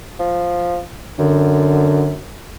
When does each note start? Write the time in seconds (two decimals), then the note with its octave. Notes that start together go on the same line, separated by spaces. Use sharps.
0.19 F3
1.19 F#2 D3